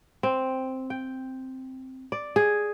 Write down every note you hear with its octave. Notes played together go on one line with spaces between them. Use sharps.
C4
G5
D5
G#4